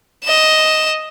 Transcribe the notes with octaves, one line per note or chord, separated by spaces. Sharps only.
D#5 E7